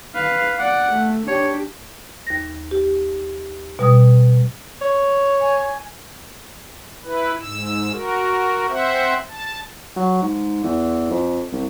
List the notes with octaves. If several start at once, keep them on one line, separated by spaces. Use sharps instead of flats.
B4 F5
D5 F#5
A3
D4 G4 C#5
D#2 A#6
G4
B2 G3 D#6
C#5
G#5
E4 B4
G#2 E6
F#4 A#4
C4 C5 E5 F#5
A5
F#3
G#2
E2
F2
C2